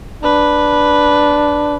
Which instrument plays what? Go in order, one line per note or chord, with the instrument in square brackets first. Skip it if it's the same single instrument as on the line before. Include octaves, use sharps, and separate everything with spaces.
[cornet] D4 [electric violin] B4